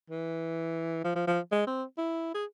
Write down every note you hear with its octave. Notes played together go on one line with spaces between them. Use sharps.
E3
F3
F3
F3
G#3
C4
E4
G#4